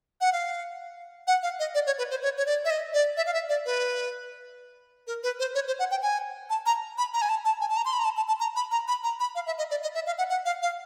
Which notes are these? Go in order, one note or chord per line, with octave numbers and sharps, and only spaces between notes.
F#5
F5
F#5
F5
D#5
D5
C#5
B4
C5
C#5
C#5
D5
E5
D#5
D5
E5
F5
E5
D5
B4
A#4
B4
C5
C#5
C5
F#5
G5
G#5
A5
A#5
B5
A#5
G#5
A5
A5
G#5
A5
A#5
C6
B5
A#5
A5
A5
A5
A#5
B5
A#5
B5
A#5
B5
F5
E5
D#5
D5
D#5
E5
F5
F#5
F#5
F5
F5